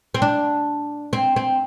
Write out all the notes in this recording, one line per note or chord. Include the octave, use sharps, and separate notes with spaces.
C4
D4
C4
C4